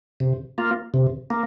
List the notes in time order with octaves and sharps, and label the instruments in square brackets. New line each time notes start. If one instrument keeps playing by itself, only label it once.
[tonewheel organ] C3
A#3 F4
C3
A#3